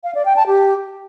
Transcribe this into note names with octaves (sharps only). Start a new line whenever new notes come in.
F5
D5
G5
A5
G4